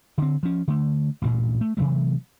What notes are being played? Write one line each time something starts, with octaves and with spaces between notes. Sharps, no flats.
D3 C4
F3 C#4
D3 A3
A1 D2 G2 A#2
A3
C3 E3 F#3 A3